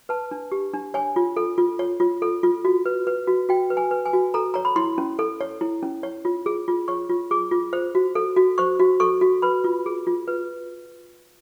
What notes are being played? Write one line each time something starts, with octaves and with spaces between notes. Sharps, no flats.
B4 A5
D4
G4
D4
C#5 G#5
F4
A4
F4
C#5
F4
A4
F4
F#4
B4
B4
F#4
F#4 G5
B4
G#5
B4
G#5
F#4
A4 A#5
C#5 A#5
B5
E4 C6
C#4
A4
C#5
E4
C#4
C#5
F4
G#4
F4
C#5 C#6
F4
G#4 D6
F4
C5
F#4
A4
F#4
C5 C#6
F#4
A4 C#6
F#4
B4 B5
F4
G#4
F4
B4